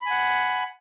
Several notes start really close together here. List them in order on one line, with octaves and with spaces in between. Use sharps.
B5 G#5 F#5